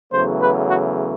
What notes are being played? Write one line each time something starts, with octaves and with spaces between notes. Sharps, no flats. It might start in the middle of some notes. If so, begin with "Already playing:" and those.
E2 C#3 F#3 A3 C5
B4
F#4